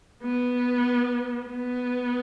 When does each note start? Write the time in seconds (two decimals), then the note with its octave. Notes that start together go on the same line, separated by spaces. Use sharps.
0.23 B3
1.47 B3